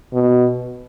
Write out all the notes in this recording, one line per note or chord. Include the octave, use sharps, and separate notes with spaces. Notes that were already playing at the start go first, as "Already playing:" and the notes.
B2